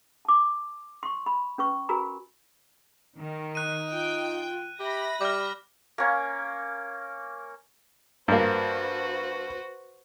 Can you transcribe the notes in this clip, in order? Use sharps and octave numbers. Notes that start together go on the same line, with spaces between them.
A5 D6
C6 C#6
B5
C#4 B4 C#6
F#4 A#4 B4 G#5 A#5 B5
D#3
D#4 F#6 D#7
F4 G5
G4 E5 B5 A#6
G3 D6 F6
A#3 C#4
G2 A#3 F#4 B4 C5